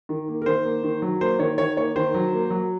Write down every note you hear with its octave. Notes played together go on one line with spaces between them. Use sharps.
D#3
A#3
A#4
D#3 C5
A#3
D#3
F#3
A#3 C5
D#3 C#5
D#3 C#5
A#3 C#5
D#3 C5
F#3
A#3
F#3